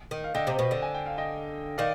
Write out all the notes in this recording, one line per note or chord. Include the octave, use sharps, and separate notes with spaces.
D#3
F5
D3 D#5 G5
C3
B2
D3
G#5
G5
F5
D#5 G5
D#3 D5 F5